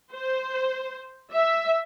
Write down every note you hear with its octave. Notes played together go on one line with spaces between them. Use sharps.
C5
E5